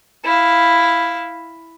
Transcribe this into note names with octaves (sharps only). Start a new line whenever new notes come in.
E4 F5